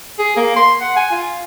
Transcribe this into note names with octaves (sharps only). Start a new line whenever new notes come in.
G#4
A#3
C6
F#5
G#5
F4